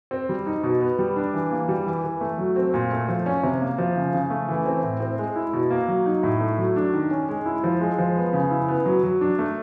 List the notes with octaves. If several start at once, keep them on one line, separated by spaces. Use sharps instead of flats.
C4
G3
D#4
B2
B3
G3
D4
E3
A#3
G3
E3
E3
A3
F#3
C4
A#2
A3
F3
C#4
C3
A#3
F3
C#3
C#3
A3
E3
C4
A2
C4
G#3
E4
B2
A#3
F#3
D#4
A2
A3
F#3
D4
D#3
C#4
G#3
E4
F3
G#3
F3
B3
C#3
E4
B3
F#3
F#3
D4
A3